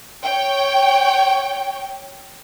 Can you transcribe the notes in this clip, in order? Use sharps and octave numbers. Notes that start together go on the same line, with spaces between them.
C#5 G5